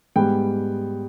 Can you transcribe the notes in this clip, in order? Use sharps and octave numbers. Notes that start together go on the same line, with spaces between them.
G#2 G3 B3 G5